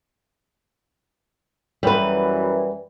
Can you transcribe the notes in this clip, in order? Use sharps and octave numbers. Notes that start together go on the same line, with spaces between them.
F#2 E3 G3 B4